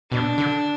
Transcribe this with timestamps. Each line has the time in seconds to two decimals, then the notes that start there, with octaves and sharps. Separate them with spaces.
0.11 B2 D4
0.38 D3